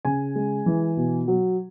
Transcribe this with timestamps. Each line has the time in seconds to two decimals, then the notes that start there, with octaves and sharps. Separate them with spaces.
0.05 C#3 G#5
0.36 G#3
0.66 E3
0.97 B2
1.28 F#3